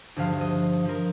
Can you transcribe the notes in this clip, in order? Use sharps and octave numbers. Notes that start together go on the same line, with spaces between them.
D2 G2 F3 F5
D#5
F3 A#4